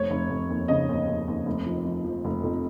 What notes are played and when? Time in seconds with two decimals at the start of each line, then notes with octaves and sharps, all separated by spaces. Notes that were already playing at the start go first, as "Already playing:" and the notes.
Already playing: F1 C#5
0.10 F1
0.30 F1
0.50 D#2
0.68 C#3 D#5
0.89 D#2
1.07 D#2
1.28 D#2
1.46 F1
1.66 F3
1.85 F3
2.04 F3
2.25 F1
2.43 F2